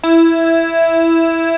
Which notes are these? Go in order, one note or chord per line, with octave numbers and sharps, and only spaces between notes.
E4